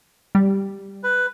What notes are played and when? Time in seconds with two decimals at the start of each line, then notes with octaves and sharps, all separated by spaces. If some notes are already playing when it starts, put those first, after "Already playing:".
0.35 G3
1.03 B4